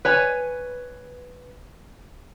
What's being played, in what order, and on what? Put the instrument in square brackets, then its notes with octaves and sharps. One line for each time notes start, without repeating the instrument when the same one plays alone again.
[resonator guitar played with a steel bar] B4 C#5 G#5